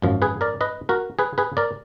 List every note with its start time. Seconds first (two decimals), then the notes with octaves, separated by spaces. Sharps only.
0.02 G#1 F#2 F3
0.22 G#4 B4
0.41 A#4 D5
0.61 B4 D#5
0.89 F#4 A#4
1.19 G#4 B4
1.38 G#4 B4
1.57 A#4 D5